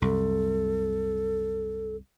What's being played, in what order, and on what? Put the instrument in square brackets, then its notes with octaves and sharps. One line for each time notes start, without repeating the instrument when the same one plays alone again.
[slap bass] C2 F#2 [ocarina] A4